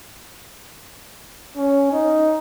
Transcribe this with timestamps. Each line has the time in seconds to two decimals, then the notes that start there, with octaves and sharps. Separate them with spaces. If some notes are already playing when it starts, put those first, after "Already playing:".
1.57 C#4
1.92 D#4